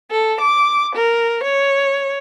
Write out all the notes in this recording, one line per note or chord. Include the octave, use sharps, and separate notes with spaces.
A4
D6
A#4
C#5